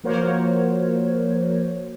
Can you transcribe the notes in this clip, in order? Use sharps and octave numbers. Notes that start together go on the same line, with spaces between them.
F3 A#3 F#4 A#4 C5 C#5